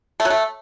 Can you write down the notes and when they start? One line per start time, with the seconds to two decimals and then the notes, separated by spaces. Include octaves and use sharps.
0.20 A3
0.25 F#3
0.30 A3